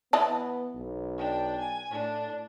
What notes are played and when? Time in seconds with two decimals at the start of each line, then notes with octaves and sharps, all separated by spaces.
0.13 E3 B3 D#5 A5
0.76 B1
1.18 D4 G5
1.60 G#5
1.91 A2 D4